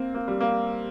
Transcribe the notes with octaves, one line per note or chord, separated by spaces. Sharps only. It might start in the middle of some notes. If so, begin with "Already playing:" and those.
Already playing: A#3 C4
A#3
G3
A#3